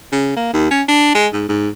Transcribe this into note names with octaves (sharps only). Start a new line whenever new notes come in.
C#3
A#3
D#2
C#4
D4
G#3
G#2
G#2